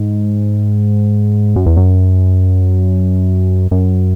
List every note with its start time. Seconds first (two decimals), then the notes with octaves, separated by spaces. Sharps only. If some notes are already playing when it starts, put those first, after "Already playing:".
Already playing: G#2
1.56 F#2
1.66 E2
1.77 F#2
3.71 F#2